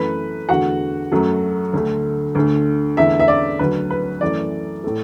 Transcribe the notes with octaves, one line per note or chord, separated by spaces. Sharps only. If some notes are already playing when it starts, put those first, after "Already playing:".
Already playing: F#2 E3 A3 B4 B5
E2 D3 A3 F#4 F#5
F#2 F#3 A3
D2 D3 A3
D2 D3 A3
E2 D3 A3 E4 E5
E5
D5
D2 D3 F#3 B4
B4
F#2 E3 A3 D5
A2 A3